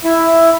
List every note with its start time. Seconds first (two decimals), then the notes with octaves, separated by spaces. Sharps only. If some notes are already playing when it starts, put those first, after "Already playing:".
0.04 E4